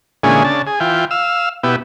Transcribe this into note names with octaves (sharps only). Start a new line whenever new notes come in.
A#2 D3 E3 G#3 C#4 G#4
C#3 D4 A5
G#4
E3 F4 G5
F5 E6
B2 B3 E4 G4